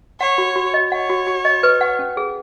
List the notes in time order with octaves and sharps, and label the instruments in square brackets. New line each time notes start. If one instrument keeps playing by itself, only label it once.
[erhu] C#5 [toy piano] F#5
[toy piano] F#4
F#4
D#5
[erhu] C#5 [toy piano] F#5
[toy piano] F#4
F#4
D#5
B4
F#5
C#4
G#4